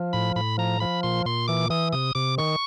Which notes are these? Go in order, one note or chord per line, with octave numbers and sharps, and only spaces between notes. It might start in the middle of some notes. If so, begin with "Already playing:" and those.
Already playing: F3
A2 B5
A2 B5
F3 A#5
F3 B5
A#2 C6
A#2 C6
E3 D6
E3 D#6
C3 D#6
C3 D6
D#3 C#6